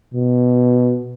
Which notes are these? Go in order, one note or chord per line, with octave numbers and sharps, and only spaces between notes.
B2